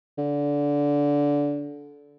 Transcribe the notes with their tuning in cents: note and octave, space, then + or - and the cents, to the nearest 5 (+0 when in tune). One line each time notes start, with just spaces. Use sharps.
D3 -20